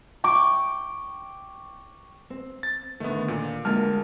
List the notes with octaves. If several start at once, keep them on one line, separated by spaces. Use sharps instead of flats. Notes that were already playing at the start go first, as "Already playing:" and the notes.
G5 C#6 D6
C4
A6
D3 D#3 A3 B3
A#2
D2 G#3 A#3 F4 A5 F6